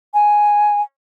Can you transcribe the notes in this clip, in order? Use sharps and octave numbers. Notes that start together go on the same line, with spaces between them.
G#5